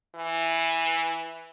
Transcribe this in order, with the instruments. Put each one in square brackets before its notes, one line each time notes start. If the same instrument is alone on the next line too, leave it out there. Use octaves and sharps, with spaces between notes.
[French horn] E3